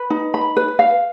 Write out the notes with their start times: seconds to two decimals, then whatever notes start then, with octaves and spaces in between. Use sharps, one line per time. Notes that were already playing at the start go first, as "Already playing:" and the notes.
Already playing: B4
0.10 D#4
0.34 B5
0.57 B4
0.79 F5